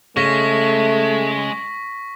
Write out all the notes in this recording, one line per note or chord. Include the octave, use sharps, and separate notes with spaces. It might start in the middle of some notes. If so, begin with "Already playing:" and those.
C#3 G#3 A3 C#6 A#6 B6